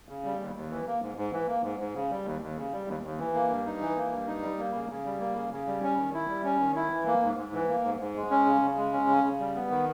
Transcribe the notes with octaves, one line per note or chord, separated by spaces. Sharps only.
C#3
G3
D#2
D#2
E3
A#3
G#2
G#2
E3
A#3
G#2
G#2
C#3
G3
D#2
D#2
C#3
G3
D#2
D#2
E3
A#3
G2
D#4
E3
A#3
G2
D#4
G3
A#3
C#3
C#3
G3
A#3
C#3
C#3
G3
C#4
D#3
E4
G3
C#4
D#3
E4
E3
A#3
G#2
G#2
E3
A#3
G#2
G#2
G#3
C#4
C#3
C#3
G#3
C#4
C#3
C#3
G3
B3
D#3